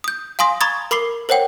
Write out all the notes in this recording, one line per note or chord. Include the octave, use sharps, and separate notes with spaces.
D#6 G6
F5 G#5 C6 D#6 A#6
A#5 B5 C#6 D#6 G#6 A6
A#4 B5 D6 C7 G7
A#4 C5 C#5 F#5 G5